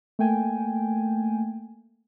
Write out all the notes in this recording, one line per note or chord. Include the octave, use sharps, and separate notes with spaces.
A3 A#3 G5 G#5